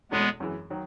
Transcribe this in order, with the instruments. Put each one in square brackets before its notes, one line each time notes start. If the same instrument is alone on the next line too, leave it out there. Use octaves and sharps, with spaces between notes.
[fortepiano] E2 B2 A3 C#4 [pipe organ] G#3 B3
[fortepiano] F#2 E3 G#3
D#3 F#3